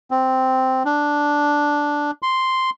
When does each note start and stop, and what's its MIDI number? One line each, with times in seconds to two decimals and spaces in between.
0.11 0.83 60
0.85 2.11 62
2.22 2.70 84